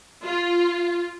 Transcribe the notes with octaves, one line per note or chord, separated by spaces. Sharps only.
F4